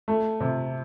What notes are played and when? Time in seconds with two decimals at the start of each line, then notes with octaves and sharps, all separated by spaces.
0.08 A3
0.40 C3